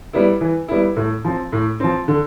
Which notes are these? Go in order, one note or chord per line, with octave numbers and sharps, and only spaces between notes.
G3 B3 E4
E3
G3 B3 E4
A2
F3 C4
A2
F3 C4
D3